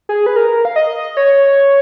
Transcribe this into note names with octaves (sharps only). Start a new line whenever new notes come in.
G#4
B4
A#4
F5
D#5
C#5